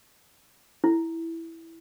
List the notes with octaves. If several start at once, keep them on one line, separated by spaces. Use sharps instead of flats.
E4